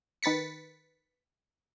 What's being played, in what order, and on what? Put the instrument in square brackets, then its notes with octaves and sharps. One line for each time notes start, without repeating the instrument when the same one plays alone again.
[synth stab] D#3 B4 A6 B6 C#7